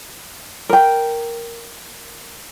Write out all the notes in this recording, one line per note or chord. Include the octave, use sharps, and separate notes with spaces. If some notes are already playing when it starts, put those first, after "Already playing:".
A#4 G5